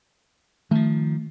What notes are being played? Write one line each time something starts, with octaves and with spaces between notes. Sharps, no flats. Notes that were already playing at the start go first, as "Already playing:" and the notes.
D#3 F3 A3